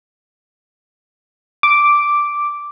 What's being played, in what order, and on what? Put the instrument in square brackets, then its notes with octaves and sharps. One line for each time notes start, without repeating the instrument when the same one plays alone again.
[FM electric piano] D6